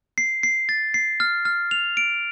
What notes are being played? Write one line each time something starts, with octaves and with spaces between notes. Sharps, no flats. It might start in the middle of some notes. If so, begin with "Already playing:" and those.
C7
C7
A6
C7
F6
F6
F7
D7